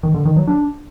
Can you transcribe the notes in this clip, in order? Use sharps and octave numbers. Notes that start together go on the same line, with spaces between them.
D#3
D3
D#3
F#3
D4